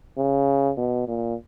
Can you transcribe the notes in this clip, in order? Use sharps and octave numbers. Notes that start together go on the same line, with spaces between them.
C#3
B2
A#2